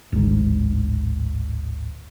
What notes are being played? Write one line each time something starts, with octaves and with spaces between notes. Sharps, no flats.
D1 G#1 D2 G#2